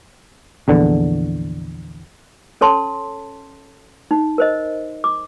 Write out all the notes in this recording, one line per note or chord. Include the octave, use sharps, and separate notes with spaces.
A#1 E2 D3
C#4 A4 C#5 A5 C6
D#4
A#4 C5 D#5
D6